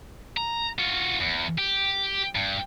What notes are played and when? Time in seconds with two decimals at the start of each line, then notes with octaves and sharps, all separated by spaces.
0.37 A#5
0.79 F4 F#4
1.20 E2
1.58 G4
2.35 G2